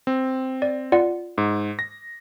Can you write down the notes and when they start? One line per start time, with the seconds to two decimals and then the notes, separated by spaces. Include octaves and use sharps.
0.07 C4
0.62 D5
0.92 F4 D5 F#5
1.38 G#2
1.79 A#6